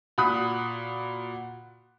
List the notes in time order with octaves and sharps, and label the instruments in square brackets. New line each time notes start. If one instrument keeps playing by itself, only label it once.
[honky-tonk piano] A#2 F#4 B5 D#6 F#6